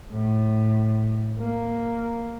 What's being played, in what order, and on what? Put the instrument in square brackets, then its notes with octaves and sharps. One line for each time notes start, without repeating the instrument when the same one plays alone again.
[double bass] A2
A#3